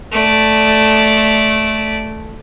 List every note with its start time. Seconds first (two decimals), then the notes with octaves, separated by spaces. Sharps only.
0.12 A3 D5